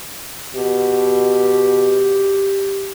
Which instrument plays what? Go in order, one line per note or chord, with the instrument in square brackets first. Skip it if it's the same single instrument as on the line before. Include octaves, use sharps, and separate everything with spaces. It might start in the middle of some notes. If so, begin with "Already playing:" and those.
[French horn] B2 [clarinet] G4